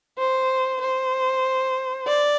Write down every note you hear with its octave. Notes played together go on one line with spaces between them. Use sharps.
C5
C5
D5